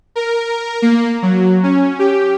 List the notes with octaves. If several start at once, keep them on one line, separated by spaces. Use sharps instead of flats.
A#4
A#3
F#3
C#4
G4